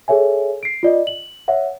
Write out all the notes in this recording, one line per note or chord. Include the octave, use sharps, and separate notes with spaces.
G#4 A4 C#5 E5 G#5
C7 D7
F4 D5 D#5
F#7
C#5 E5 F#5